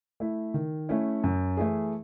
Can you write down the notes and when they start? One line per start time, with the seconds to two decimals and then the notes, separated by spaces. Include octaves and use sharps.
0.20 A3 E4
0.54 D#3
0.89 A3 C#4 E4
1.24 F#2
1.57 E3 A3 E4 G#4